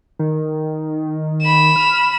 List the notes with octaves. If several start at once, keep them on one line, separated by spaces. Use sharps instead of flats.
D#3
B5 E7
F6